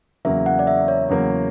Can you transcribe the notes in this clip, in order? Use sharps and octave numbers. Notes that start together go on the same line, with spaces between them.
E2 C#3 F#3 A#3 E5
F#5
D5
E5
C#5
E2 C#3 F#3 A#3